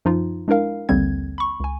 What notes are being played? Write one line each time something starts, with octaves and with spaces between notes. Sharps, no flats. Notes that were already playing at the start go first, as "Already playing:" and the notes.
F#2 F3 D#4 F4
G#3 D4 E4 A#4 F5
A#1 D#2 D3 G3 C4 G#6
B5 C#6
C#2 G#5